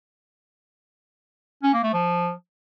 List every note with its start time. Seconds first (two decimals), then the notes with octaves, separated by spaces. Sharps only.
1.63 C#4
1.73 A#3
1.83 A3
1.94 F3